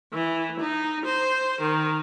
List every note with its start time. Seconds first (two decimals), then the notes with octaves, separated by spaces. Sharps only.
0.13 E3
0.60 D#4
1.05 C5
1.61 D#3